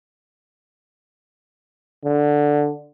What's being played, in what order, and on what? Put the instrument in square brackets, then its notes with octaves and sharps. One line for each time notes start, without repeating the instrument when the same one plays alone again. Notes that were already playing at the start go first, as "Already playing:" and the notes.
[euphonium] D3